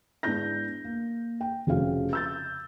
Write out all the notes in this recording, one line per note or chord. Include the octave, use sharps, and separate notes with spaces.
G#2 B3 D4 E4 G6 A#6
A#3
G5
F1 F2 C#3 F#4 F5
E6 G6 A6